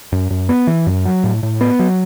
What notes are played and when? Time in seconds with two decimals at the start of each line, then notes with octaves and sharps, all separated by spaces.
0.12 F#2
0.30 F#2
0.49 B3
0.67 E3
0.87 F#2
1.05 F#3
1.24 A2
1.43 A2
1.61 B3
1.79 F#3